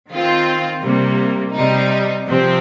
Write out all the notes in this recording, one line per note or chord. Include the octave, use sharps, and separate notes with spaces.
D#3 C4 F4
C3 G3 A#3
C3 G3 D#4
C3 F3 C4